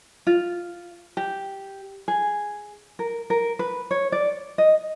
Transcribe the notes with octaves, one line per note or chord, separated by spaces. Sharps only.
F4
G4
G#4
A#4
A#4
B4
C#5
D5
D#5